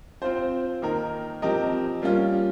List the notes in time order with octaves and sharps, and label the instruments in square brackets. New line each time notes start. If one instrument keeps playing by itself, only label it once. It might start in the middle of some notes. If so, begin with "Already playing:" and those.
[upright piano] C4 F4 C5
D#3 A#3 D#4 A#4
F3 C4 G4 A#4 D#5
G3 A#3 C#4 F4